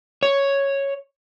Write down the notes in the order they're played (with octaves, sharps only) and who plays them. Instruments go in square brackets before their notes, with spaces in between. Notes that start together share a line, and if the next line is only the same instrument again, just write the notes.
[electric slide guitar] C#5